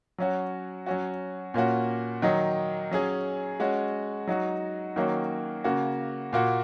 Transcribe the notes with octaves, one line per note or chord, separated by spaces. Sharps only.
F#3 C#4 F#4
F#3 C#4 F#4
A#2 A#3 C#4 F#4
D#3 F#3 D#4
F#3 C#4 G#4
G#3 C#4 F#4
F#3 D#4 F#4
D#3 F#3 A#3 C#4 F#4
C#3 A#3 F#4
A#2 A#3 F#4